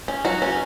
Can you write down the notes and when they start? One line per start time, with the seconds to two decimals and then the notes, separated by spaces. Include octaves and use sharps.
0.08 C#4
0.25 F#3 F#4
0.42 C#4